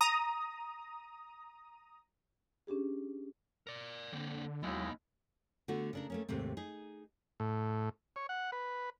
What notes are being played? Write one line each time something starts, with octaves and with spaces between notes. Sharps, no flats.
A#5 D#6
C#4 D4 G4 G#4
A#4 D5
D3 A#3 C4
D#2 F#3 G#3 B3 D#4 E4
D3 A3 B3 F#4
C#3 D4 A#4
A3 A#3 C#4
D#2 G#2 C3 A3 C4
D#4 G#4
A2
C#5
F#5
B4